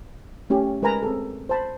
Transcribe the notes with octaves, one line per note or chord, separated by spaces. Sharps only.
A3 C#4 G4
G#3 A#4 B4 G#5 A#5 B5
C4 G#4 A4
C5 A5 B5